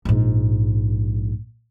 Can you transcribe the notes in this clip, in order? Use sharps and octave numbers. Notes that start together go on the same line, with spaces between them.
A#1 G#2